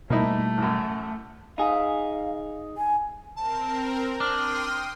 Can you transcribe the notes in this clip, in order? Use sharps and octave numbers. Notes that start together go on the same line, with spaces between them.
B2 G3 A3 A#3 D#4 E4
A1 F#2
D#4 G#4 F5
G#5
C4 A#4 A5
D4 G5 C6 D#6 F6